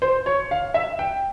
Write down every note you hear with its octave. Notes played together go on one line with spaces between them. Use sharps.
C5
C#5
F5
E5
G5